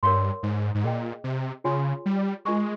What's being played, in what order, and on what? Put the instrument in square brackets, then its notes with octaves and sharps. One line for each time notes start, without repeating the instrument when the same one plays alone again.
[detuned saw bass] G2 [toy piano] A#4 C#5 F5 C6
[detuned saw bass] G#2
G#2
[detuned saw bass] A#2 [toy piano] G#4 D#5 G5
[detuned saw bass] C3
[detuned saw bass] C#3 [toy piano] F4 G#4 C#5 G#5 C6
[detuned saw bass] G3
[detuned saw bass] G#3 [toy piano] F4 A#4 D#5 G#5 C#6